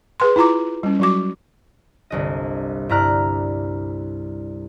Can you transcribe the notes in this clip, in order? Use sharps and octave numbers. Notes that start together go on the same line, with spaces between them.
G#4 B4 C6
E4 F4 A#5 D6
G3 C#4
F#3 F#4 D6
G1 C2 D#5
G2 E4 D5 A#5 F6 F#6